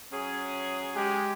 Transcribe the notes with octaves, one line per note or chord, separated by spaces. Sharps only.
F#3 C#4 G#4
G#3 G4